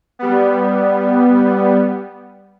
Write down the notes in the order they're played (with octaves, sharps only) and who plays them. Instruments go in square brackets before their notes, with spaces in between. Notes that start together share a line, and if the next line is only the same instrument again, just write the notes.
[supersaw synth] G3 B3